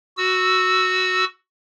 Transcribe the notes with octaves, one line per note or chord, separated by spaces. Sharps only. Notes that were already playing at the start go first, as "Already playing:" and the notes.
F#4 E6